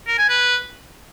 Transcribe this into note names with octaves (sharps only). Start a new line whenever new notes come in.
A#4
G#5
B4